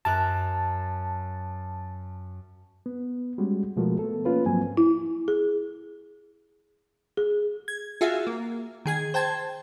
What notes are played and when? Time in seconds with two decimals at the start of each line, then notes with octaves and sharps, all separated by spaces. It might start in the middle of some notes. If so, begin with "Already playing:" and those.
0.05 F#2 A#4 A5 F#6
2.86 B3
3.38 G3 G#3 C#4 F#4
3.77 B2 F3 G#3 A3 F#4 A#4
3.99 A3 B3 A4
4.25 A#3 C#4 F4 B4
4.46 G#2 F3 F#3 A#3 C4 G#5
4.77 E4
5.28 G#4
7.17 G#4
7.68 G#6
8.01 F4 F#4 G#4 E5 F5
8.27 A#3
8.86 D#3 G#4 G#6
9.14 C5 G5 A5 G#6